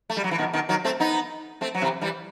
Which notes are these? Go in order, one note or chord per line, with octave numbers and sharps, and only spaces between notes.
A3
G3
F#3
E3
B2 D#3
B2 D#3
D#3 F#3
A3 C4
B3 D#4
A3 C4
F#3
C3 E3
E3 G3